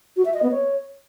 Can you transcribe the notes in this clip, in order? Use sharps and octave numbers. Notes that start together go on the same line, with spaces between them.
F#4
E5
D#5
B3
C#5